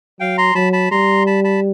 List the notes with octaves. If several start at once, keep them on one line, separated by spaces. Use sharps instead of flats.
F#3 F5 G5
A#5 C6
F#3 A5 B5
A5 B5
G3 A#5 C6
A5 B5
A5 B5